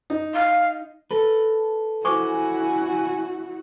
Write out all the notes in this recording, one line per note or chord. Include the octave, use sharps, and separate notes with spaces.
D#4
F5
A4 B4
E4 F#4 C5 G#5 C#6 D6